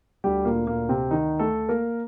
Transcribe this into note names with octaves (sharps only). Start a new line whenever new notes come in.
D2 D3 G3 G4
A#2 A#3
A#2 A#3
C3 C4
D#3 D#4
A3 A4
A#3 A#4